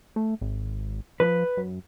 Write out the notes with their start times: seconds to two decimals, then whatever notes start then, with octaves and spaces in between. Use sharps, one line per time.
0.16 A3
0.41 G#1
1.20 F3 B4
1.57 F#2